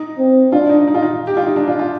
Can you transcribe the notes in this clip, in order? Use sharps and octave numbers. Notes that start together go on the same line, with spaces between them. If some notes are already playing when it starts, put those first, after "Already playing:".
Already playing: D#4
C4
D4 F4
D#4
D#4
F4
D#4
G4
F4
D#4
D4
F4
F4